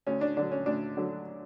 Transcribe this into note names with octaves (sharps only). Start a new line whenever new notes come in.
D2 C#4
D4
D3 F#3 D4
C#4
D2 D4
D3 F#3